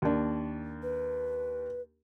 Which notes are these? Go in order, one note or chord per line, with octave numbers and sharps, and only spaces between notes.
D#2 D4
B4